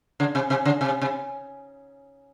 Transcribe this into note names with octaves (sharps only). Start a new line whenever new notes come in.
C#3
C3
C3
C#3
C3
C3